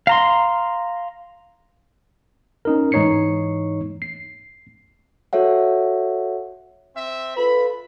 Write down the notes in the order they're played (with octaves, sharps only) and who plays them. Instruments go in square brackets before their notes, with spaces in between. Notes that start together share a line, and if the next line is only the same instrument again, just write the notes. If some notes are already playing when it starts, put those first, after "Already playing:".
[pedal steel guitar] F5 A#5 C6
[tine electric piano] C#4 D#4 A#4
G#2 E3 D#4 C#5 C7 C#7
C7
[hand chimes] F#4 A4 C#5 E5 F#5
[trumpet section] C4 E5
[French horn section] F4 A4 B4 [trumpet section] B5